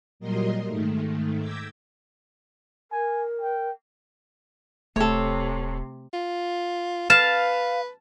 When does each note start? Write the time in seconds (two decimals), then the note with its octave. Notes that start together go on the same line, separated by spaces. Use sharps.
0.20 A#2 F#3 G3 A#4 D#5 C6
0.67 G#2 D#3 A3
1.39 D6 E6 G6 G#6 A#6 B6
2.91 A#4 G#5
3.41 G5
4.96 D1 C3 A3 A4 C#5
6.14 F4
7.10 B4 F5 A5